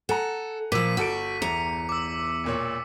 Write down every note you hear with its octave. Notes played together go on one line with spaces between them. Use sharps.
A4 F#5 G#5 A#5
A#2 F3 D6 E6 B6 D#7
G1 F#4 A4 D7
E2 A#5 C#7
D6 E6
E1 A#2 C#5